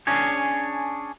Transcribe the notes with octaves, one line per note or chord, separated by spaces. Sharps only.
C#4 D4 G#4 C#5